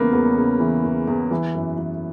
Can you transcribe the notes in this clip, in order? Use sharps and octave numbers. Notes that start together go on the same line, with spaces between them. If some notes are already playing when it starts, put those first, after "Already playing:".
Already playing: E2 C#3 E3 A#3 B3 C#4
E2 B3
C#3
E3
E2
E2
E3
F#2
E3